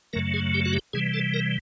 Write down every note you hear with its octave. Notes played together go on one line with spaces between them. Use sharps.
F#2 C#3 F#3 A3 A#4
G#4
G4
F#4
G4
C3 E3 G3 G#4
A4
A#4